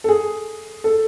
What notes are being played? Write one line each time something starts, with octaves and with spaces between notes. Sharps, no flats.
A4
G#4
A4